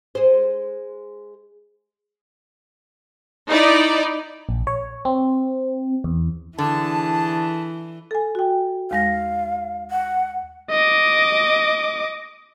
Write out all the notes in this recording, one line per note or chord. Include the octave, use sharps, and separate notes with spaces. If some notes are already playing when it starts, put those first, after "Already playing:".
G#3 C5
D#4 E4 D5
A#1
C#5
C4
E2
D3 E3 G#4 A5
A4 G#5
F#4 G5
D#2 G#3 F5 A#6
F#5
D#5 D6